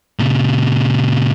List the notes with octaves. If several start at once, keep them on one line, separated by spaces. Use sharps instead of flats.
A#2 C#3